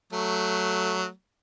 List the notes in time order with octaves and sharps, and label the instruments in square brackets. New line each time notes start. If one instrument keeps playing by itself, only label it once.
[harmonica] F#3 A3